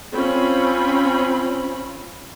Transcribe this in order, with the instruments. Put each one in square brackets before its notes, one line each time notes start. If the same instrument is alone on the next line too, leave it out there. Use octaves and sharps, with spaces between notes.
[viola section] C4 C#4 F4 B5